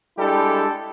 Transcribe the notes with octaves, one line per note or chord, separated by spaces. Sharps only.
G3 G#3 D4 E4 G4 A4